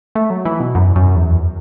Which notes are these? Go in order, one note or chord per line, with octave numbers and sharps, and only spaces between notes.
A3
F#3
E3
B2
F#2
F#2
E2